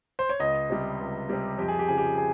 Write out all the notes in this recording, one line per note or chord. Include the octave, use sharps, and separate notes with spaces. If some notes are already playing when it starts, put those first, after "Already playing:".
C5
C#5
C#2 D#5
C3 G3
C#2
C3 G3
F2 G4
G#4
G4
C#3 F3 G#4
G4
G#4